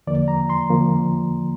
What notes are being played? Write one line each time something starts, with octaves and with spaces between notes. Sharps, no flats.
E2 D3 F3 A#3 D5
A#5
C6
D3 F3 A#3